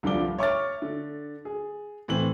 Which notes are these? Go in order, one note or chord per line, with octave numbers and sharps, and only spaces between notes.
C2 G2 D3 F3 D6 G7
C#5 E5 C#6 D6 F6 A6
D3
G#4
A2 E3 C4 F#7